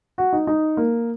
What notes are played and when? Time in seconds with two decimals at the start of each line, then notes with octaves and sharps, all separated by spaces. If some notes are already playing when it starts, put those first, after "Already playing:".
0.18 F#4
0.33 D#4
0.47 D#4
0.77 A#3